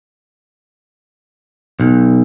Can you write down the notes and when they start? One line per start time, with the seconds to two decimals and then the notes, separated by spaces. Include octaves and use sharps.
1.80 B1